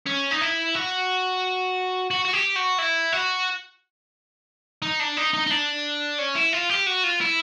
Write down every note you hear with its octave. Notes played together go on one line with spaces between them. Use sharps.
C#4
D#4
E4
F#4
F#4
F#4
G4
F#4
E4
F#4
D#4
D4
D#4
D#4
D#4
D4
C#4
E4
F4
G4
F#4
F4
E4